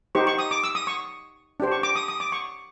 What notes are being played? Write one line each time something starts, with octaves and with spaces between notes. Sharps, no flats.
D#4 G4 C5 C#6
C#6
D#6
D6
E6
D#6
C#6
D4 G4 C5
C#6
D6
D#6
D#6
D6
C#6